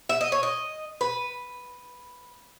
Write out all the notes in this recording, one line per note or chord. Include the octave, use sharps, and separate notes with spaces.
E5
D#5
C#5
D#5
B4